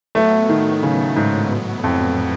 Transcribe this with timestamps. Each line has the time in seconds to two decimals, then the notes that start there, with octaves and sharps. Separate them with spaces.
0.15 A2 F#3 A3 B3
0.49 D#3
0.83 C#3
1.16 G#2
1.84 F2